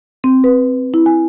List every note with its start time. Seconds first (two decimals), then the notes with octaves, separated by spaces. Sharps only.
0.24 C4
0.44 B4
0.94 E4
1.06 G#5